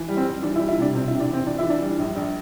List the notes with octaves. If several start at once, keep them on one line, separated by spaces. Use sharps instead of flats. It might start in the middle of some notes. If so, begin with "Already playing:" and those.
Already playing: E3
G3
C4
G3
E3 D4
E4
G3
E4
C3 D4
C3 C4
E4
C3
D4
E3 C4
E3 D4
E4
E3
D4
G3
A#1
A#1